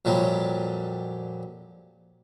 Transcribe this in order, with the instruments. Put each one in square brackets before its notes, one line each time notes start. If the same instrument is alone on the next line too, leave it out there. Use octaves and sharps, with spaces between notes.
[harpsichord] F2 A#2 F#3 G3